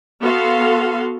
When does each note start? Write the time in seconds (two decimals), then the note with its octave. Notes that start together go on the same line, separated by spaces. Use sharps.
0.21 B3 F#4 A4 F5 C6